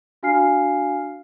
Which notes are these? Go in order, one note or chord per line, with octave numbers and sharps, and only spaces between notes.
D4 F#4 F5 G#5 F6 C7